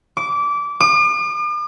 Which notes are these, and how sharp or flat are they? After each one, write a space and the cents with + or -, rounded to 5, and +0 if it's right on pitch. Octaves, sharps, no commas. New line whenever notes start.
D6 -20
D6 +45